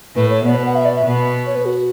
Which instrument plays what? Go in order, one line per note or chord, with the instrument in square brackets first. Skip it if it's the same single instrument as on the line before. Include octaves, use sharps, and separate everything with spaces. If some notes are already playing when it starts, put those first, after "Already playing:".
[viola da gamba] A2 A3 [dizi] B4
[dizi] C#5
[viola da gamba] B2 B3 [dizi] D5
[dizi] B4
F#5
E5
D5
E5
[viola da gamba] B2 B3
[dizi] C#5
B4
F#4